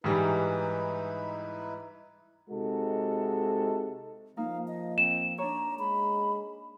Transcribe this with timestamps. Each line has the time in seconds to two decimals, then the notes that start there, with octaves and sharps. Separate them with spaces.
0.04 G#2 E3 G3 D#4 E4 B4
2.50 C3 G#3 D#4 F#4 A4
4.37 F3 A#3 D#4 F5
4.68 D#5
4.98 C4 E7
5.38 D4 C#5 A#5
5.79 G#3 B5